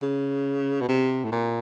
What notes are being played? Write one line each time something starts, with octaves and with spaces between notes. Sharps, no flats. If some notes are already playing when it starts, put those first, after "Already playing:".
C#3
B2
C3
A2
A#2